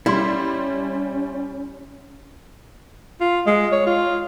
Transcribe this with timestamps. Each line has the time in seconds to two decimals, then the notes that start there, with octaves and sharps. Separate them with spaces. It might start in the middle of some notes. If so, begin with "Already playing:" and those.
0.06 G3 C#4 E4 C6
3.20 F4
3.47 G#3
3.72 C#5
3.87 F4